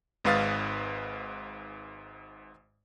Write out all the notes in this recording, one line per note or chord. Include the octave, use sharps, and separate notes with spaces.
G#1 G#2 B4 F5 D#6 A6